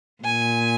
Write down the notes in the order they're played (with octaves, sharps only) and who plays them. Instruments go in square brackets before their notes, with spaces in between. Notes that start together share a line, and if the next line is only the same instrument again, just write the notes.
[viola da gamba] A#2 [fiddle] G#5